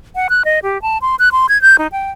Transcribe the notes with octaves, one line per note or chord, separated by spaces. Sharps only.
F#5
F#6
D#5
G4
A5
C6
F#6
C6
G#6
G6
D#4
G5